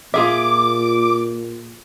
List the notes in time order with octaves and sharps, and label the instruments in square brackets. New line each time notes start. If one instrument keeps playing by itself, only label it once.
[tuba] A#2 [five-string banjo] F4 G#4 E5 [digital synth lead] D6